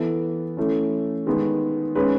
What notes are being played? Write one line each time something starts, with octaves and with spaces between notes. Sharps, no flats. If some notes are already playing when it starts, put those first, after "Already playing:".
Already playing: E3 B3 A4
E3 A3 C#4
D#3 G#3 B3
D#3 G#3 C#4 B4